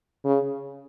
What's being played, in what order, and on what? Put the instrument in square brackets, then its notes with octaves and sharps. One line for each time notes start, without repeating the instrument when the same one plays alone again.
[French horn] C#3